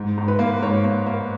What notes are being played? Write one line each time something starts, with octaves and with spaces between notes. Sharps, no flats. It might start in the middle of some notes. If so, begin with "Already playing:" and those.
Already playing: G#2
G#2
B4
A#3
B4
G#2 C#5
A#3
A#3